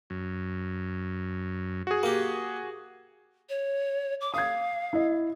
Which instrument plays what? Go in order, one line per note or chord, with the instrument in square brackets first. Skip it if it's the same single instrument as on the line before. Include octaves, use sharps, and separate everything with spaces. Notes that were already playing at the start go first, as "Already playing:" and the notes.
[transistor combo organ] F#2
[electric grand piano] F#4 G#4
[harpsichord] A#3 G4
[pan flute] C#5
D6
[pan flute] F5 [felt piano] D#6 G#6
[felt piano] E4 D#5